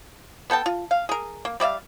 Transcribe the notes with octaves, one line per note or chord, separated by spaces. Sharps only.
B3 A4 G5 A5
F4
F5
G#4 A#4
A#3
G3 D5 E5 F5